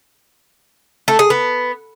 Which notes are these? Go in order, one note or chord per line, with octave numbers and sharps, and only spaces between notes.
A3
G#4
B3